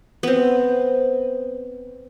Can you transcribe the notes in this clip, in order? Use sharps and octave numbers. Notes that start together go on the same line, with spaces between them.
B3 C4